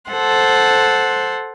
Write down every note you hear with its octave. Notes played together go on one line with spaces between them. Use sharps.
A4 C5 F#5 C6